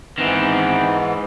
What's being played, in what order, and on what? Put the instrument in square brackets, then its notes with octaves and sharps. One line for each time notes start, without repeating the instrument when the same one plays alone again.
[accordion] G#2 E3 B3 [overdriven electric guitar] D#3 C4